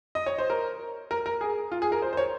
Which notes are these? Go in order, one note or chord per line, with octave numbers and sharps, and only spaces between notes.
D#5
C#5
C5
A#4
A#4
A#4
G#4
F4
G#4
A#4
C5
C5
C#5